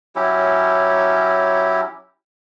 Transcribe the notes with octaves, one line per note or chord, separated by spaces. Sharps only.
F#3 C#4 E4 G4